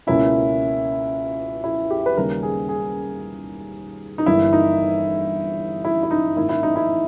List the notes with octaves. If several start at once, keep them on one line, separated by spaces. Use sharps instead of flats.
C#2 B2 A#3 C#4 E4
E4
G4
B4
D#2 C#3 G3 A#3 C#4 A#4
G#4
G#4
D#4
G1 G2 E3 A#3 E4
D#4
E4
E4
D#4
G#2 D#3 A#3 E4
E4
D#4
E4